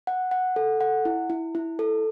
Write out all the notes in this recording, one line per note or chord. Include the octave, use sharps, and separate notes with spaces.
F#5
F#5
A4
F#5
E4
E4
E4
A4